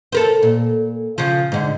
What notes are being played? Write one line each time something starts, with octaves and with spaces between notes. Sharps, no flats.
A4 A#4 C5
A#2
C#3 F3
G#2 D3